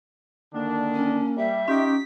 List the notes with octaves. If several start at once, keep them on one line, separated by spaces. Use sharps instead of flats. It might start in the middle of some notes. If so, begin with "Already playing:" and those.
D3 D#3 A#3 D4
C#4
G3 E5
C#4 D#4 F4 G4 B6